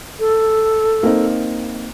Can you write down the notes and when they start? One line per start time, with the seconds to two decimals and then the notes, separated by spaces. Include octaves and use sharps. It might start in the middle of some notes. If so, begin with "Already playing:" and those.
0.20 A4
1.03 A#3 C4 D#4